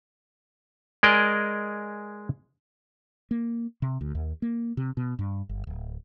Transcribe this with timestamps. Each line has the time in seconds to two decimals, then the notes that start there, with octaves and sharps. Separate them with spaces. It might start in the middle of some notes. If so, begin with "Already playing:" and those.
1.03 G#3 G#4 A#4 D5 D#5
3.31 A#3
3.82 C3
4.01 D2
4.15 D#2
4.42 A#3
4.77 C3
4.97 B2
5.19 G2
5.49 G1
5.67 D1